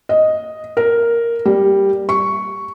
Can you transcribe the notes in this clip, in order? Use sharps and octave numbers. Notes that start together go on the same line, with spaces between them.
D#5
A#4
G3
C#6